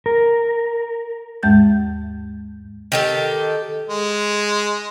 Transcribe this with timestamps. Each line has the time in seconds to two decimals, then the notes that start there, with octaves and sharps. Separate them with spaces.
0.06 A#4
1.43 D#2 G#2 G#3 G6 A6
2.92 D#3 G4 A4
3.90 G#3